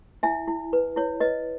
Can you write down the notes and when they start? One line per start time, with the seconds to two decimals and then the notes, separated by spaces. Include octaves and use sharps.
0.23 E4 E5 G#5
0.48 E4
0.73 B4
0.96 E4 C#5
1.20 B4 D#5